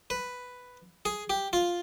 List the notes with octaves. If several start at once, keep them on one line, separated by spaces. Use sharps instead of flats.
B4
G#4
G4
F4